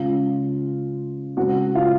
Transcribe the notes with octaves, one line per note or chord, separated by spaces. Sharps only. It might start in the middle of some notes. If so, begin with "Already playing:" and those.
Already playing: C#3 G#3 C#4 F4 F5
C#3 G#3 C4 F#4 F#5
F4 F5